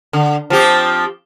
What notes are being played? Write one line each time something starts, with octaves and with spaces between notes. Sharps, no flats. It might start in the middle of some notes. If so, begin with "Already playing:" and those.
D3
F3 C4 G4